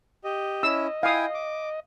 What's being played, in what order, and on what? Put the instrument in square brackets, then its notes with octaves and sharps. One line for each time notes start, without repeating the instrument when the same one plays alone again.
[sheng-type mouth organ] G4 D#5
[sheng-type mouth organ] C#4 E4 [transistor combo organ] D#5 [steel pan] E6
[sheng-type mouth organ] E4 G5 G#5 [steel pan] F5 D#6
[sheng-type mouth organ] D6